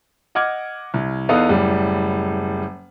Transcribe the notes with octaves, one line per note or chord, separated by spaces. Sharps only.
D#5 F#5 D6 F6 G#6
C2
E2 B3 D#4 A4 F5 D#6
F#1 A2 G3